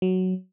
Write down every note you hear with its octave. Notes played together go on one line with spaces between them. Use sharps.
F#3